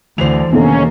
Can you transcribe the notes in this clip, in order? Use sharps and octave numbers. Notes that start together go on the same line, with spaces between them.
D2 D3 E3 E4 C5 F7
D#2 B2 D3 D#3 A#3 C#4